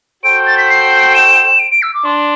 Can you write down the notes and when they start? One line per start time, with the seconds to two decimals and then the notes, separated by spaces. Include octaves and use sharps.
0.24 F#4 A4 C5 G5 D7
0.47 A6
0.58 B6
0.69 C7
1.14 E7
1.59 D7
1.71 D7
1.82 E6
1.94 D6
2.05 D4 C6